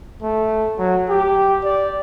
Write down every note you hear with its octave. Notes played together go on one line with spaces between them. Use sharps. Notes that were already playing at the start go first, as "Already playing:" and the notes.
A3
F#3
G4
D5